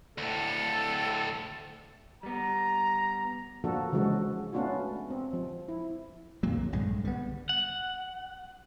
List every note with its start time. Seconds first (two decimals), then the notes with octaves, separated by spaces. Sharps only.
0.18 D2 A2 A4
2.23 G3 B3 A#5
3.64 F3 A#3 D4 F#4 A4
3.92 C#3 E3 F3 G#3 F#4 A4
4.53 A3 B3 C#4 D4 F4 F#4
5.10 C4
5.33 F3
5.68 E4
6.43 F2 A#2 D#3 F#3 A#3
6.55 B1
6.72 A#1 G2 G#3
7.05 D3 G3 B3
7.49 F#5